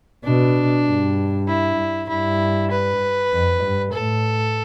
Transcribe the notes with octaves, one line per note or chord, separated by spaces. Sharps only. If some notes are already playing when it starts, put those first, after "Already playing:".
B2 D4
G2
E4
G2 E4
B4
F2
G2
A2 A4